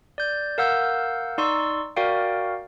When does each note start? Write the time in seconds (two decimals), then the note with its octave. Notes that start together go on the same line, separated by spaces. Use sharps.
0.18 D5 G6
0.58 A#4 F5 F#5 E6 G6
1.38 D#4 D5 C6 C#6 E6
1.96 F#4 A#4 D5 F5 G5